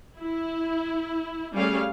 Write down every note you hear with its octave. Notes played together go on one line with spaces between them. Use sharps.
E4
G3 A3 C#4 G#4 F5